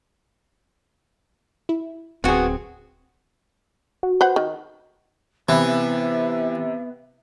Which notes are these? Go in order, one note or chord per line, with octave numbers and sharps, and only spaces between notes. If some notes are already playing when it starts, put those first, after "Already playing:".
E4
D1 B3 C4 F#4 G#4 G#5
F#4
B4 C5 F#5
D#3
C3 E3 B3 E5 B5